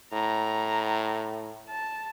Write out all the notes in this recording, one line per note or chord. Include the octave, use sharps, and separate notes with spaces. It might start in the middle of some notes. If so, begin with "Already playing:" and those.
A2 A#5
A5